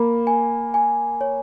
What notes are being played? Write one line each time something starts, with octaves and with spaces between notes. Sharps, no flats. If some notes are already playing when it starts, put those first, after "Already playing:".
Already playing: A#3 B5
G#5
G#5
C#5